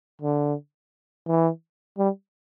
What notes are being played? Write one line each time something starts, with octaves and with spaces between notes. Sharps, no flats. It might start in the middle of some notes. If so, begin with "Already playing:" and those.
D3
E3
G3